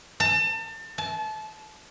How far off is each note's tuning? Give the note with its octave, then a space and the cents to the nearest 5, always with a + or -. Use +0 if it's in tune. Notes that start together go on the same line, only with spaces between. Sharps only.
A5 +35
A5 -30